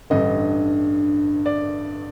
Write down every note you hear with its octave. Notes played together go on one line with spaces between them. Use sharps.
A1 G2 D3 D#5
D5